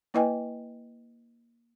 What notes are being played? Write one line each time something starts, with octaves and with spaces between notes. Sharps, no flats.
A#3 E4 B4 D#5 G5 G#5